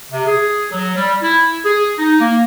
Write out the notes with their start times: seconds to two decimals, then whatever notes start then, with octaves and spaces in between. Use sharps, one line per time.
0.12 C3
0.26 G#4
0.72 F#3
0.96 G3
1.22 E4
1.65 G#4
1.99 D#4
2.20 A#3